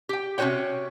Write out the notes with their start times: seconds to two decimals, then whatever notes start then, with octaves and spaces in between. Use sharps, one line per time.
0.09 G4 G5
0.38 C3 C#4 F#4 C5 C#5 G5